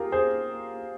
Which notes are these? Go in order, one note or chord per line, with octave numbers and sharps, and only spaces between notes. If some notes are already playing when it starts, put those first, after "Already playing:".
Already playing: F4 G4 G#4 A#4
G#4 C5